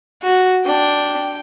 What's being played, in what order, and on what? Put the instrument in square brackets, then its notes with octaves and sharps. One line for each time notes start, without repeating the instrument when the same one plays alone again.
[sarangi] F#4
[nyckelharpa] D4 [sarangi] G5